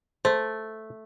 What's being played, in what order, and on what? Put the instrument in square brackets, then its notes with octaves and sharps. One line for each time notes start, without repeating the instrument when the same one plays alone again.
[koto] A3 [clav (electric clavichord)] C5